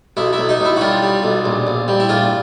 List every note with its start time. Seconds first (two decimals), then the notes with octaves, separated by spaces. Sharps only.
0.17 B1 E4
0.33 E4
0.38 B1
0.49 D#4
0.60 B1 E4
0.76 F#4
0.81 G3 F4
1.02 G3
1.24 B1
1.45 A#1
1.67 A#1
1.88 G3
2.00 E4
2.09 A#1 F4